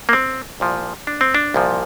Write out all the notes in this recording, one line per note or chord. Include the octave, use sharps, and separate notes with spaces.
A#3
C4
C2 A#2 F3
D4
C4
D4
C2 A#2 F3